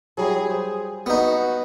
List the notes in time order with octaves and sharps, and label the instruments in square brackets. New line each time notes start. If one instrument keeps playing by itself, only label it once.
[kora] F#3 G3 E4 [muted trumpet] G#4
[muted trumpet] G#4 [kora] C5
[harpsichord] B3 D#4 [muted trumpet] F#4